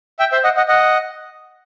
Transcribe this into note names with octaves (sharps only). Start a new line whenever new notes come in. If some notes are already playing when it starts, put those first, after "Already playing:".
E5 G5
C5 E5
D#5 F#5
D#5 F#5
D#5 F#5